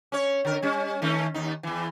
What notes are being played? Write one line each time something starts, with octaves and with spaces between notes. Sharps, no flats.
C#4 C#5
D3 A#4
G3 C#4
D#3 A3 C#4
D#2 D#4
E2 E3